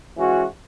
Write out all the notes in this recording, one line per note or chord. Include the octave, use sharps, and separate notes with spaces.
E3 G#3 C#4 F#4